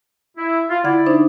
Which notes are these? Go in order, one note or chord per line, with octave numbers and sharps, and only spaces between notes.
E4
F4
D3 E4 D5 F#5 G#6
D4 D#4 C5